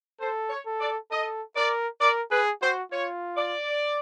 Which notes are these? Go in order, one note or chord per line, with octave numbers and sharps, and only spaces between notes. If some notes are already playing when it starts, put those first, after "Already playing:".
A4 C5
C#5
A4
D5
A4 D#5
A#4 D5
A#4 D5
G#4 B4
F#4 C5
F4 C#5
D5